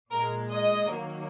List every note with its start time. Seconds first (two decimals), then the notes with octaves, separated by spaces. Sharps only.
0.12 A#2 G#3 A#4
0.51 D#5
0.92 D#3 F#3 A#3